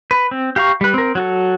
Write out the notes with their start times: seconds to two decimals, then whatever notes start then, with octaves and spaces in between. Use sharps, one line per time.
0.11 B4
0.31 C4
0.56 G4 F5 A#5 C#6
0.81 G3 B4
0.94 C4 A#4
1.15 F#3 F#4 A4